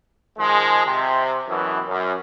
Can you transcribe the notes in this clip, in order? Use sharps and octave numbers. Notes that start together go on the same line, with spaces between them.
D#3 F3 G#3
C3
F#2 B2 E3
F#2